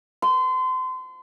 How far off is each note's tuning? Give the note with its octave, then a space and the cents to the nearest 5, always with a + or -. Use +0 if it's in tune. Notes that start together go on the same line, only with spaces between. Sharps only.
C6 -30